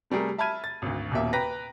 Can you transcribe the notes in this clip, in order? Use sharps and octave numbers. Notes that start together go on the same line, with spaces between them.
C3 G3 A3 G#4 A#4
E5 A5 B5 F6 G#6 D#7
A6
G#1 D2
D#1 D#2 B2 A#3 G4 E5
B4 G5 A#5 A#6 B6